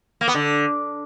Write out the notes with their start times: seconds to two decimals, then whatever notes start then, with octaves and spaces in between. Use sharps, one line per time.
0.21 A#3
0.28 B3
0.34 D3